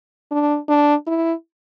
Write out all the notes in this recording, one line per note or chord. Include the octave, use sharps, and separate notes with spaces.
D4
D4
E4